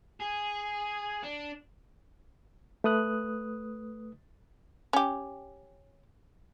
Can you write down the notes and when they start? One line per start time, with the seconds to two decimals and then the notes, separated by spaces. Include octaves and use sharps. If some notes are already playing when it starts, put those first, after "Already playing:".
0.20 G#4
1.23 D4
2.84 A3 B4 D#6 F#6
4.93 C#4 G4